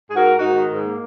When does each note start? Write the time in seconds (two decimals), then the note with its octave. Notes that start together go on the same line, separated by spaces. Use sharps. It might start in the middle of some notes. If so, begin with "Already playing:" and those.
0.09 G#2 G#4
0.15 F#4 A#4
0.23 A#3
0.38 G#2 D#4 F#4
0.54 D#3
0.70 G#2
0.84 A#3